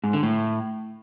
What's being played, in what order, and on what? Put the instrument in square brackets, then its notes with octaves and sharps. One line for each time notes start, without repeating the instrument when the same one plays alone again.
[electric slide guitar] G#2
D3
A2